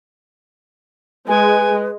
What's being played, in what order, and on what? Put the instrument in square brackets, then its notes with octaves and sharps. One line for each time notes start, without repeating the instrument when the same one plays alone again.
[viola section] G#3 [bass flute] B4 [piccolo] G#5